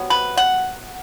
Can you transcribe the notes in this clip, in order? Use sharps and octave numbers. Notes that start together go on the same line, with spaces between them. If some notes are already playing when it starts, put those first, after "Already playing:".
Already playing: C3 F#3 B3
B4
F#5